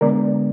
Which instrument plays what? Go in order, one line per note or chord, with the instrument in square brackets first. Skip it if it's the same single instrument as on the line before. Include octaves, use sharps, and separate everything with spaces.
[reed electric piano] D3 G#3 B3 A#4 D5